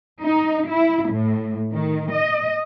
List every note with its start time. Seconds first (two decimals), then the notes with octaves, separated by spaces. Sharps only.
0.20 D#4
0.68 E4
1.10 A2
1.71 D#3
2.11 D#5